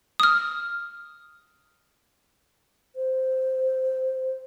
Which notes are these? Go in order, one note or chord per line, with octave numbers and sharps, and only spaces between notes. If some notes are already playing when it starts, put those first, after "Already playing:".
D#6 F6
C5